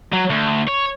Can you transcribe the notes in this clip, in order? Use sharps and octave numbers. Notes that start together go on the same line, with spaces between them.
F#3
D2
C#5